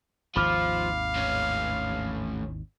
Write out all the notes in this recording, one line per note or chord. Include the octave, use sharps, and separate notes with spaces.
G#1 D#2 F3 F5 B5 D6 F6
A2 C#4